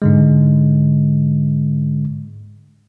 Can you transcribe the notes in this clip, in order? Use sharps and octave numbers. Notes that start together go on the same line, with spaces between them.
G#2 D3 G#3